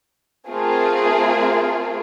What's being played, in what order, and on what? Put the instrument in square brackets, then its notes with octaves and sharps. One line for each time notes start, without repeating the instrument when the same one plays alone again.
[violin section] A3 C4 F4 G#4 A#4